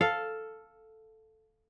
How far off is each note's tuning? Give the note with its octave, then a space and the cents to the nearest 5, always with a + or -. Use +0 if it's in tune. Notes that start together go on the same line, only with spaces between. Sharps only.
A4 +0 F5 +0